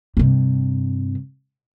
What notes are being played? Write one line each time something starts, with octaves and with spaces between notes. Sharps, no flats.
G2 C3